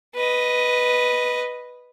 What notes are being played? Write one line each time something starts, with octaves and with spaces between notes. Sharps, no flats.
B4 D#5